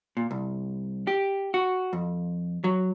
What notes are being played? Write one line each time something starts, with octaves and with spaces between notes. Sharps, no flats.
A#2
C2
G4
F#4
F2
F#3